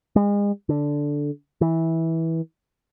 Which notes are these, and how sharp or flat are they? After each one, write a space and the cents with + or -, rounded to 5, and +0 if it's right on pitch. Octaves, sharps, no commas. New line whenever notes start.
G#3 -35
D3 -5
E3 -15